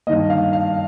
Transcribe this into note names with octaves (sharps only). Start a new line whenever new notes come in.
G2 D#3 A#3 D#5
F5
F5